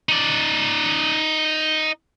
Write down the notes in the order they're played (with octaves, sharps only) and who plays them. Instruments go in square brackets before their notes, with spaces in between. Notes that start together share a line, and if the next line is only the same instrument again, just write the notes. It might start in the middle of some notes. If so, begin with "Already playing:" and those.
[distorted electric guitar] D#4 D5